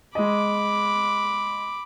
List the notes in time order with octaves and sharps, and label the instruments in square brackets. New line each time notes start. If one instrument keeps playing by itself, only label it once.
[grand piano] G#3 D#5 [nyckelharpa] B5 D6